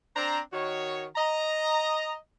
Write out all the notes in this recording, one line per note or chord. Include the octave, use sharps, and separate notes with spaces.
C4 D4 C5 A#5
D#3 F#4 C#5
D#5 A#5